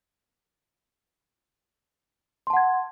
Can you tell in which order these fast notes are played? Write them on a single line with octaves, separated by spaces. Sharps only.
C6 A5 F#5 G#6